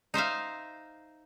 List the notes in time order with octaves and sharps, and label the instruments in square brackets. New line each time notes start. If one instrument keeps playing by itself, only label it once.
[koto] D#4 C5 E5 F5